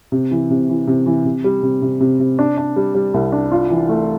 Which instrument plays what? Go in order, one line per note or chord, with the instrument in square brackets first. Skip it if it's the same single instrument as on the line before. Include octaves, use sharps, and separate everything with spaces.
[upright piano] C3
E3
C3
E3
C3
E3
C3
G3
C3
C3
C3
C3
D4
D4
G3
G3
C2
D4
F4
E3
A3